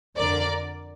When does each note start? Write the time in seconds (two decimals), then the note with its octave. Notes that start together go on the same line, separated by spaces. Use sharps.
0.17 F2 D3 A#4 D5